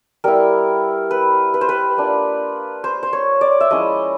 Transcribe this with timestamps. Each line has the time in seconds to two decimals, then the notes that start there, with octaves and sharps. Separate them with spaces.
0.24 G3 B3 E4 A#4
1.11 B4
1.54 B4
1.61 C5
1.69 B4
1.97 A#3 D4 F4
2.84 C5
3.03 C5
3.13 C#5
3.41 D5
3.61 E5
3.71 F3 G#3 C#4 E4 D#5